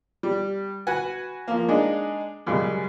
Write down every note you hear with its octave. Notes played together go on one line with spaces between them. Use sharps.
G3
F#4 B4 F#5 G#5
F3 A#3
G#3 D4 D#4
F#2 C#3 G3 G#3